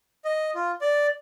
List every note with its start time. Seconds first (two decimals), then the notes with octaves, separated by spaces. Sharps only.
0.25 D#5
0.55 F4
0.81 D5